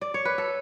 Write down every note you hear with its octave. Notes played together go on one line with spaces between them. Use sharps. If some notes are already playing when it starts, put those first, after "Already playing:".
D5
C#5
B4
A4